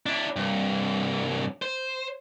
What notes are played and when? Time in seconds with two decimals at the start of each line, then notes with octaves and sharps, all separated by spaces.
0.06 D4 E4
0.36 C2 G2
1.62 C5